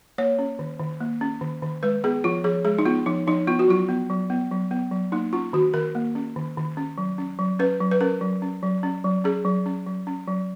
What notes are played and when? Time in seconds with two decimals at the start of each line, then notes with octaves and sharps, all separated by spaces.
0.18 A#3 C#5
0.39 C#4
0.59 D#3
0.79 D#3
1.01 A#3
1.21 C#4
1.41 D#3
1.62 D#3
1.83 G#3 B4
2.04 B3 G#4
2.24 F3 F4
2.44 F3 G#4
2.65 G#3 G#4
2.79 D#4
2.85 B3 F4
3.06 F3 D#4
3.27 F3 D#4
3.47 B3 F4
3.59 F#4
3.68 F#3 F4
3.89 B3
4.10 F#3
4.30 B3
4.51 F#3
4.71 B3
4.92 F#3
5.12 A#3 D#4
5.33 C#4 F4
5.53 D#3 F#4
5.74 D#3 A#4
5.95 A#3
6.15 C#4
6.36 D#3
6.57 D#3
6.77 C#4
6.98 F#3
7.18 C#4
7.39 F#3
7.59 C#4 B4
7.80 F#3
7.91 B4
8.01 C#4 A#4
8.21 F#3
8.42 C#4
8.63 F#3
8.83 C#4
9.04 F#3
9.24 C#4 G#4
9.45 F#3
9.66 C#4
9.87 F#3
10.07 C#4
10.27 F#3